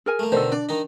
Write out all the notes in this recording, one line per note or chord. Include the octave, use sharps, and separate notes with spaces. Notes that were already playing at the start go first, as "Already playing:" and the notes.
G#4 A#4 G#5
A3 A#3
B2 D3 D#3 A4 C5
D4 D5
D#3 D#4